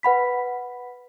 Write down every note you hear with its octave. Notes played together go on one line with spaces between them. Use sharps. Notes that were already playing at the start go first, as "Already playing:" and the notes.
B4 F#5 B5 B6